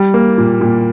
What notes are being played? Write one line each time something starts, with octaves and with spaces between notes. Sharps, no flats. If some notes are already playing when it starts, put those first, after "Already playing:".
Already playing: G3
A#3
A#2
A#2